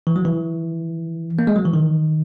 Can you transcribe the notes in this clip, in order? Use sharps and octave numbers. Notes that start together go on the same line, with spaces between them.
E3
F#3
E3
A#3
G#3
F#3
E3
D#3